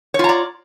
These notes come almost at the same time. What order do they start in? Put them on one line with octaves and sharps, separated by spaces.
C#5 F4 A#5 D5